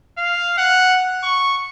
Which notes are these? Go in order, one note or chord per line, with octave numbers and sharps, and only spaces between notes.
F5
F#5
C#6